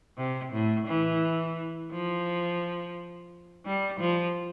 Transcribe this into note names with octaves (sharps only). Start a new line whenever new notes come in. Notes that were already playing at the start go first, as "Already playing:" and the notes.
C3
A2
E3
F3
G3
F3